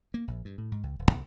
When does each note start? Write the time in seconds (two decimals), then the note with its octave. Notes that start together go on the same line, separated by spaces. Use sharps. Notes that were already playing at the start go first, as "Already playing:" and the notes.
0.14 A#3
0.28 A#1
0.45 G2
0.58 A2
0.72 G#2
0.83 C#2
0.99 D#1
1.11 C2